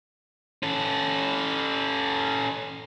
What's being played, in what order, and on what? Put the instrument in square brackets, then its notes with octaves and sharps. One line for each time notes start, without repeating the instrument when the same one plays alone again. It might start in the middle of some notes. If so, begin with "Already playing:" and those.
[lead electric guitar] C#4 A4